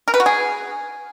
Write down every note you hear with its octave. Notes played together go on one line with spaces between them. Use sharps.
A#4
B4
F#4
G#4